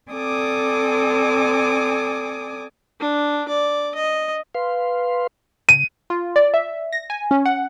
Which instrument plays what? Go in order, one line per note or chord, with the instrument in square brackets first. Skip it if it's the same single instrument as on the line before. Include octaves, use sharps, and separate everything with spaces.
[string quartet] C4 A4 D5 G#5 D6 D#6
[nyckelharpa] D4
D5
D#5
[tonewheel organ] B4 F5 C6
[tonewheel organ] C#3 [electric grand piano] D#7
[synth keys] F4
D5
E5
A#6
G#5
C#4
F#5